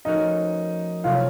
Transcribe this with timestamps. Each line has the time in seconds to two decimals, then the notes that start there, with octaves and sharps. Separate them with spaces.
0.05 F3 A3 C#4 D#4 F#4 A#4 D#5
1.04 C3 F#3 A3 C#4 F4 F#4 F5